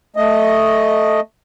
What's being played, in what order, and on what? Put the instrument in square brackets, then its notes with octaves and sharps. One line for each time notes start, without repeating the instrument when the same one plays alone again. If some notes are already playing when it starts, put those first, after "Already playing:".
[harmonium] A3 D#5